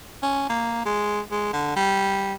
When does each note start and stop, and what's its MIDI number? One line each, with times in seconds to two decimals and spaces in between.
0.23 0.48 61
0.50 0.84 58
0.85 1.20 56
1.31 1.51 56
1.53 1.74 50
1.76 2.34 55